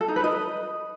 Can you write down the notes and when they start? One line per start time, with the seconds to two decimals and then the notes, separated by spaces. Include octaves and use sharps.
0.01 A4
0.08 D#4
0.16 B4
0.24 D#5